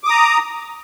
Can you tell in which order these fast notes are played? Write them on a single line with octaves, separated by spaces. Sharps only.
D6 D#6 A#5